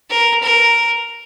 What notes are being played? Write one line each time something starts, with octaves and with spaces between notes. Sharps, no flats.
A#4
A#4